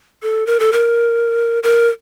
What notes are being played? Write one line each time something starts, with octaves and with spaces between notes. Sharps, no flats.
A4
A#4
A4
A#4
A#4